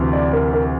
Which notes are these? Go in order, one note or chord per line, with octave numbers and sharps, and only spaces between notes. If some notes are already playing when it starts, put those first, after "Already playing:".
Already playing: D2 C3 E3
D5
A#4
A#4